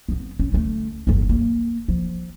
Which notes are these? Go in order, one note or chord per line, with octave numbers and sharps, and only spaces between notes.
B3 C4
C#4
D2 A3
G1 E2
A#3
F3